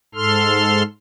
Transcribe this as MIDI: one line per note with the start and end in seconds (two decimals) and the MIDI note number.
0.15 0.83 44
0.15 0.83 69
0.15 0.83 84
0.15 0.83 89